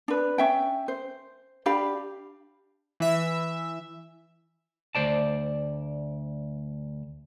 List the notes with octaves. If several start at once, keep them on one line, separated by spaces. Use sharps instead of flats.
D4 B4
C#4 E5 G5
C5
D4 G4 F5 B5
E3 E5
D2 C5 D5 A5